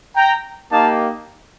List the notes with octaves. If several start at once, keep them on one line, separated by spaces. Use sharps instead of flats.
G5 A#5
A#3 D#4 G4 F5 A5